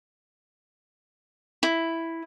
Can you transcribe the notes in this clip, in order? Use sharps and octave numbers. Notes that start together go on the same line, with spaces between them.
E4